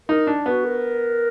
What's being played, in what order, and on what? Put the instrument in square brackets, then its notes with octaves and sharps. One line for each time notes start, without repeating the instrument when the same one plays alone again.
[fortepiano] D#4 [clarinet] A#4
[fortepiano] D4
[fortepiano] B3 [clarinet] F#4
[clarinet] A#4